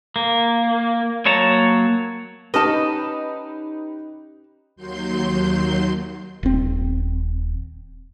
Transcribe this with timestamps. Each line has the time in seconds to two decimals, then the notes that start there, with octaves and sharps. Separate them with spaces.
0.16 A#3
1.26 F#3 A#3 C#5 A5 A#5
2.54 C#4 D#4 G4 B4 D#5 A5
4.76 D#2 F#3 C6 G6
6.43 D#1 C4